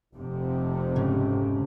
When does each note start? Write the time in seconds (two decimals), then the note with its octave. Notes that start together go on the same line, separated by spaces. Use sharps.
0.13 F1 F2 C3
0.96 G#2 C#3